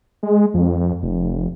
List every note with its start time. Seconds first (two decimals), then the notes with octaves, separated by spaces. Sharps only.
0.23 G#3
0.54 F2
1.03 F1